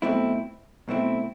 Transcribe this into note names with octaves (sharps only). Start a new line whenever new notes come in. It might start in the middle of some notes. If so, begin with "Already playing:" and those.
B1 B2 A3 C4 E4
B1 B2 A3 C4 E4